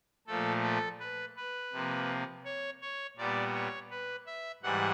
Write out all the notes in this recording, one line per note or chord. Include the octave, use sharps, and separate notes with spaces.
A#2 F3 A3 A4
A4
B4
B4
C3 F3 A#3
C#5
C#5
A#2 G3 B3 D5
C#5
B4
E5
G#2 E3 G3 F#5